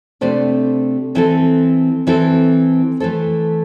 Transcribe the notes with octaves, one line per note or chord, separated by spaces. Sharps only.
C3 A3 D4 G4 C5
E3 C4 E4 A4
E3 C4 E4 A4
E3 A3 E4 A4 C5